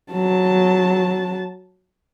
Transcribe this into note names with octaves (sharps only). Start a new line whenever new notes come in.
F#3 A5